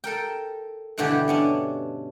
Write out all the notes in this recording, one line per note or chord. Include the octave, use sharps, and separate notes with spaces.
A4 A#4 G5
G2 B2 D3 E3 B3 G4
B2 C#4 D4